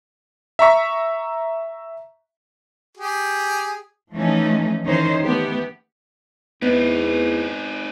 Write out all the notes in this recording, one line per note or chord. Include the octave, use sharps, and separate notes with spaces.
E5 A#5 C#6 B6
G4 G#4
E3 F3 A3 C#4 D#4
D#3 E3 C#4 D#4 C5 C#5
A3 B3 G4
E2 B3 C4 D#4